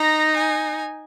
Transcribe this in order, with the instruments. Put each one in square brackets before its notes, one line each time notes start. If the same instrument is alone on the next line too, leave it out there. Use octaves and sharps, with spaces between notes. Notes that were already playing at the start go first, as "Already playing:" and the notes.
Already playing: [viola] D#4 [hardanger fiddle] A#5
[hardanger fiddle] G#5